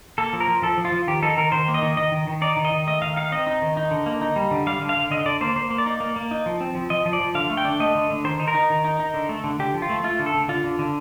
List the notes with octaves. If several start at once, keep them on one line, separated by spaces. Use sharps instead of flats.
A#3 A4
F3
A#4
F3
F3 A4
F3
F4
F3
D#3 G4
D#4 A4
D#3 A#4
D#3 C5
A#3
D#5
D#3
D#3 D#5
D#3
D#3
D#4 D5
D#3
D#5
D#3
A3 D#5
D#3 F5
D#4 F5
C4 D#5
D#4
D#3
D#4
D3
A#3
D#4
G3
D3
G3 F5
D3
F5
D3
D3 D#5
D3 D5
A#3 C5
A#3 C5
A#3
D5
D#4
A#3
A#3
D#4
F3
C4
F3
F3 D#5
F3
D5
F3
D3 F5
A3
G5
D4
A3 D#5
D3
D3
D#3 C5
D#4
A#4
D#4
D#3
D#4
D#4
D3
A3
D3
D3 G4
F3
F4
A3
A3 F4
D3
A4
D3
D3 F4
D3
D3